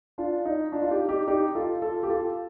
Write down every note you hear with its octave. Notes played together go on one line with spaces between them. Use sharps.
D4 F4
D#4
D4 F4
F4
D#4 G4
D#4 G4
D#4 G4
F4 A4
F4 A4
G4
F4 A4